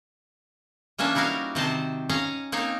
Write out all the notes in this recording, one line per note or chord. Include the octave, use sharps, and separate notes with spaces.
E3 A#3 C#4 D4 E5
G3 D#4 E4 F#4 A#4 F5
C3 D#3 C4 C5 D#5 A5
C#4 D#5 F5 A#5
A#3 C4 D#4 C#5 F5